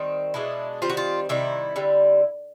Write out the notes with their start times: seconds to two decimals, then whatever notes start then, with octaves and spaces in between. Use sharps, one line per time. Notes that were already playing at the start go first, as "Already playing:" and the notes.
Already playing: D#3 G3 C4
0.34 B2 G#3 B3 D4 E4
0.82 D#3 G3 C4 F4
0.90 F#4
0.97 F4
1.29 C3 D#3 G3 E4
1.76 D3 G3 C4